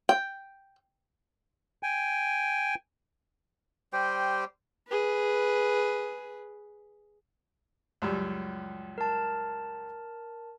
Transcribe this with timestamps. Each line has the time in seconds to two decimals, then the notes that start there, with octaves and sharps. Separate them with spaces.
0.09 G5
1.83 G5 G#5
3.93 G3 G4 C5 G5
4.88 G#4 B4
8.02 C#2 F#2 G3
8.98 A#4 A5